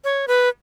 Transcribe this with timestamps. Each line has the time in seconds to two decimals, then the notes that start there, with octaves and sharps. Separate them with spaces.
0.04 C#5
0.28 B4